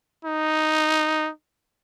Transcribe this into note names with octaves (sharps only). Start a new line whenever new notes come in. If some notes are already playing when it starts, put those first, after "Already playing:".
D#4